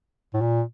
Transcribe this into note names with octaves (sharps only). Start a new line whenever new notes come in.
A2
A#2